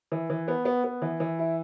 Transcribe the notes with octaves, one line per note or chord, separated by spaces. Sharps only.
E3
E3
B3
B3
B3
E3
E3
E4